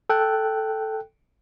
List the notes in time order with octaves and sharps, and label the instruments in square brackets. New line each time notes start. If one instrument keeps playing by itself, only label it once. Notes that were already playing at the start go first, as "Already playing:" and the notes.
[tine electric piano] A4 G5 F#6